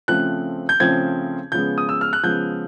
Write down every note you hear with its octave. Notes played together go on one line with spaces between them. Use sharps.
C#3 F3 A3 C4 F#6
G6
C#3 F3 A3 C4 G#6
C#3 F3 G#3 B3 G6
D#6
E6
F6
F#6
C#3 F3 G#3 B3 G6